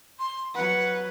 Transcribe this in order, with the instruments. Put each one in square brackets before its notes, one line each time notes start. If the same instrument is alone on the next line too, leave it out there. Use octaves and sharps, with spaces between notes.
[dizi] C6
[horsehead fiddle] F#3 B4 [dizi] F#5